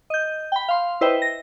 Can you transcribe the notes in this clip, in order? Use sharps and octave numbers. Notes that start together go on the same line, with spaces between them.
D#5 G6
G5 B5
F5 C6
E4 B4 C5 D#5 E5 G5
A#6